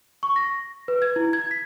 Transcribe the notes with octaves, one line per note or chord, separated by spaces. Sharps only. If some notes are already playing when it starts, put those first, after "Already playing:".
C#6
A#6
B4
G#6
E4
G#6
B6